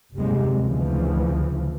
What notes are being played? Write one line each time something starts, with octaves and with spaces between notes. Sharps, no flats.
F#1 D#2 C3 G3 G#3
D2 C#3 E3 F3